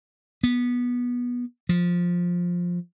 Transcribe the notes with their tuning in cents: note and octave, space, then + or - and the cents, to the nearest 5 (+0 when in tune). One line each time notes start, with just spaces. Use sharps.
B3 -15
F3 +10